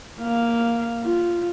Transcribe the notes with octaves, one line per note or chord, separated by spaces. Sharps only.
A#3 F5
F4